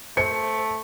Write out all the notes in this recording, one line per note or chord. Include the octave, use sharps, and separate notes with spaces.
A3 C5 C#7